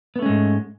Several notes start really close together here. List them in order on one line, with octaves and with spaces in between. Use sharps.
B3 A3 C#4 G#3 G#2